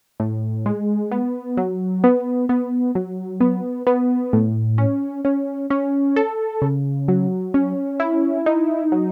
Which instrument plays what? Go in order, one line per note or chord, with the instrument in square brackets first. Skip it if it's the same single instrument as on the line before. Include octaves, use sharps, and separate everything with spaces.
[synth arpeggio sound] A2
G#3
B3
F#3
B3
B3
F#3
B3
B3
A2
C#4
C#4
C#4
A4
C#3
F#3
C#4
E4
D#4
F#3